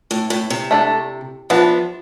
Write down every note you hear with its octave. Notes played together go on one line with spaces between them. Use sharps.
A2
A2
C3
A3 D4 A4
E3 F3 B3 D4